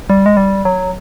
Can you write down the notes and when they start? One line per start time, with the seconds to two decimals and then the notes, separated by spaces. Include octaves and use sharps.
0.10 G3
0.26 G#3
0.37 G3
0.65 F#3